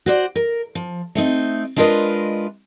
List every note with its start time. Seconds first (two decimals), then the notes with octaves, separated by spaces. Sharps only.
0.06 F#4 C5 D5
0.35 A#4
0.75 F3
1.15 A3 C4 D#4
1.76 G#3 D4 F4 A#4 B4 D#5